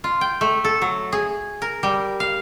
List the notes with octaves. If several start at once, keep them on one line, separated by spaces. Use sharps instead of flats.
F4
G5
A3
A4
F#3
G#4
A#4
G3
F5